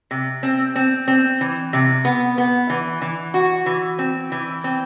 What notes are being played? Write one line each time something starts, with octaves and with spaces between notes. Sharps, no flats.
C3
C4
C4
C4
E3
C3
B3
B3
E3
E3
F#4
E3
C4
E3
C4